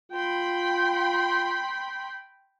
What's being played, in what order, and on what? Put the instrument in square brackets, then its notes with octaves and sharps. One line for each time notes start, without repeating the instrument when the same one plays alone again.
[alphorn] F4 [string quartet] G5 B5 C6